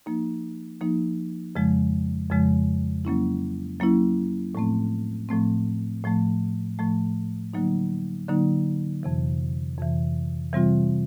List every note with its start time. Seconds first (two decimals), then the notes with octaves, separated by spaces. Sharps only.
0.06 F3 A#3 D#4
0.81 F3 A#3 D#4
1.56 F2 C#3 F3 G#3
2.30 F2 C#3 F3 G#3
3.05 F#3 A#3 C#4 E4
3.80 F#3 A#3 C#4 E4
4.55 A2 F3 A3 C4
5.29 A2 F3 A3 C4
6.04 A2 F3 A3
6.79 A2 F3 A3
7.54 D3 F#3 A#3 D#4
8.28 D3 F#3 A#3 D#4
9.03 F2 C3 E3
9.78 F2 C3 E3
10.53 C3 E3 G3 C4 F4